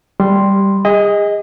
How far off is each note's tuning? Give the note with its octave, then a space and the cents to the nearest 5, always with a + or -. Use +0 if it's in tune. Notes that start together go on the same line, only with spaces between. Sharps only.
G3 +0 C6 +0
G#4 -35 D#5 +10